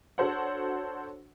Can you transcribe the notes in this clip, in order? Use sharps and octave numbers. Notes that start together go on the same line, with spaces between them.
D4 F#4 A4 C5 C#5 F#5